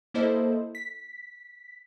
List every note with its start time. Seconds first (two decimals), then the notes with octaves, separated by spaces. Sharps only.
0.14 A#3 E4 A4 C5 D#5
0.75 B6